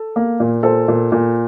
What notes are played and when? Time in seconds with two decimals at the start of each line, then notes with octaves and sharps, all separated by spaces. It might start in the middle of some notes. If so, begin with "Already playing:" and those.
Already playing: A4
0.16 A#3
0.40 A#2
0.63 A#2 A4 C5
0.88 A#2
1.12 A#2